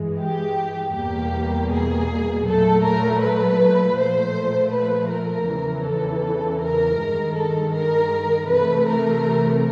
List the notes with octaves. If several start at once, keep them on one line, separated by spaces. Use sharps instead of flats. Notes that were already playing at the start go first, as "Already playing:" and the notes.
Already playing: G2 E3 G#3
G4
E2 B2 G3 A#3 G4
G#4
A#2 F#3 A3 A4
A#4
B4
A#2 F3 A3 C5
B4
A#4
E2 C#3 E3
A4
A#4
G2 D#3 G#3
A4
A#4
C3 E3 A3 B4
A#4